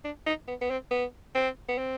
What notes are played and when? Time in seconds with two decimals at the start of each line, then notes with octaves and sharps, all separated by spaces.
0.05 D4
0.26 D#4
0.48 B3
0.62 B3
0.70 C4
0.91 B3
1.35 C4
1.69 B3
1.78 C4